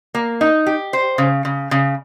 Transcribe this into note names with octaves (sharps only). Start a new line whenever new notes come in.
A#3
D#4
G4
C5
C#3
C#3
C#3